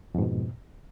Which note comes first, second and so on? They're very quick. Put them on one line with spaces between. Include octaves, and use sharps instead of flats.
F2 G#2 B2